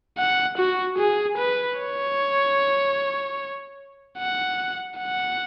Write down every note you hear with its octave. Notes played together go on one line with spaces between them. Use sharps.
F#5
F#4
G#4
B4
C#5
F#5
F#5